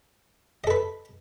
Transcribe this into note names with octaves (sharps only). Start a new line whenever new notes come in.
A4 B4 D#5